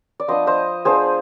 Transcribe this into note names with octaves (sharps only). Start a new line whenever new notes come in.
D5
F3 B3 D4 C5 D#5
C5 D#5
F3 B3 D4 G#4 C5